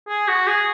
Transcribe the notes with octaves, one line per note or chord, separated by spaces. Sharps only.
G#4
F#4
G#4